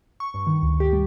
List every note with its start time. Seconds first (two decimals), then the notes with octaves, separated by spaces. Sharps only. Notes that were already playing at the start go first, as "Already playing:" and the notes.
0.20 C#6
0.34 G2
0.47 D#3
0.62 D2
0.80 G4
0.93 G3